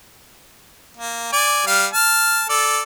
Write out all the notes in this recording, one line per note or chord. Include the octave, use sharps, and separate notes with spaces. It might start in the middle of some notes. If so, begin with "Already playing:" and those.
A#3
D5 G#5
G3 F5 F6
A5 F6
A4 D5